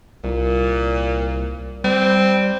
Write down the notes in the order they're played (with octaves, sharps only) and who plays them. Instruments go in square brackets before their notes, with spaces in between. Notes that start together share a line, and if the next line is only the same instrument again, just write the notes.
[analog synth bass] C2 [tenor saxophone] A#2
[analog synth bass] G3 [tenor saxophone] C4